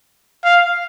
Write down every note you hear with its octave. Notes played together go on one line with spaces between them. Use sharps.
F5